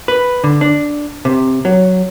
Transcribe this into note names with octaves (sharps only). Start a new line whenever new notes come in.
B4
D3
D4
C3
F#3